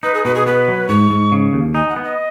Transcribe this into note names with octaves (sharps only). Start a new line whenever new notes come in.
D#4 B4
G#4
B2 B4
G#4
B3 B4
F#3
G#2 C#6
G#2
C#3
D#2
D#4 G#5
F#5
B3
D#5